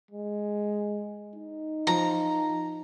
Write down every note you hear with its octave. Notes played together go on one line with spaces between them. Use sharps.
G#3
D#4
F3 A#5